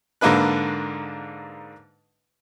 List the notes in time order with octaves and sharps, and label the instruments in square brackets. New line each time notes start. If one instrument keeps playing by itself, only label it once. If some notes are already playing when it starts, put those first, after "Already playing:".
[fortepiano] G#2 D3 A#3 D4 B4 F#6